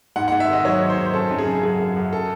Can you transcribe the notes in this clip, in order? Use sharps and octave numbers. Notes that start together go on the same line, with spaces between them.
G#2 F#5
G#2 F#5
E5
D#3 D#5
F#3 C#5
G#2
C5
G#2
C5
F#2 A4
F#2
G#4
C#3
F#3 G#4
F#2
F#2
A4